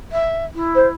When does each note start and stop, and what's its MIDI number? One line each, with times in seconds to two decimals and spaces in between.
0.12 0.44 76
0.54 0.94 64
0.75 0.87 72